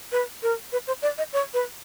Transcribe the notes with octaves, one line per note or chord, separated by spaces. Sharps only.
B4
A#4
B4
C5
D5
D#5
C#5
B4